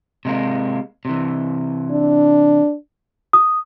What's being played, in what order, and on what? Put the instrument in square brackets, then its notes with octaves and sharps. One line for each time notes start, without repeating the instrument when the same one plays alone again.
[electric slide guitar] C3 G#3 A#3
C3 E3
[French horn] D4
[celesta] D#6